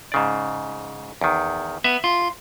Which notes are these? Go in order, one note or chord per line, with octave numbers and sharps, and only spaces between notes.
G#2 C#3 D5
E2 D#3
B3 E5
F4